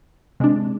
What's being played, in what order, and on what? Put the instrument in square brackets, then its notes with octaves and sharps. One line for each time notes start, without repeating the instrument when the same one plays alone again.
[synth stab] C3 G#3 D4